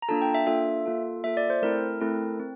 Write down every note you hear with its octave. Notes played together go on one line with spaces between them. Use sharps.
A#5
A#3 D4 F4 A4 A5
G5
E5
A#3 D4 F4 A4 E5
A#3 F4 A4
A#3 F4 A4 E5
D5
C5
A3 C4 E4 A4 A#4
A3 C4 E4 A4
C4